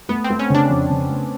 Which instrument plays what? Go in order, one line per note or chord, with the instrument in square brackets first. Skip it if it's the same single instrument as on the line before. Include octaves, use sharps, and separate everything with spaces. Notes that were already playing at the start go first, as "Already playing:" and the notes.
[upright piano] A3 [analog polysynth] B3
[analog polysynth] C4
[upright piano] A3
[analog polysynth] C#4
[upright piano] C#3 [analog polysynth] D4
[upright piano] F2
C#3
A3